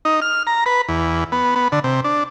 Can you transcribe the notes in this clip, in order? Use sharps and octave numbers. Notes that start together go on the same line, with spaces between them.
D#4
F6
A#5
B4
E2
B3
B3
D3
C3
D4